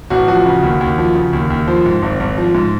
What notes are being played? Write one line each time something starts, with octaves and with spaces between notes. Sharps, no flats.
A1 F#4
F3 F#4
C#3
D#2
D#2
F3
C#3
D#2
D#2
F3 C5
G#2
G#1
G#1
F3
G#2